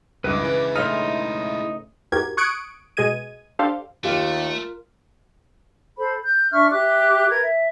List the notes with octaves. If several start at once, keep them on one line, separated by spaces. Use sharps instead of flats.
C#2 G2 G#3 E4 B4 D6
C#3 E3
A2 C#3 E3 D#4 C6 F6
E2 G#2 F#4 G4 A#4 G#6
C#6 D#6 F#6 G#6 C#7 D7
B2 G#3 G#4 D#5 G#6 D#7
D4 G4 A4 C5 F5
D#2 A3 F4 G4 A#4 F5
A4 C5 B5
G6
D4 E5 C#6 F6
G4 E5 D6 F#6
A#4 B4 G#6
E5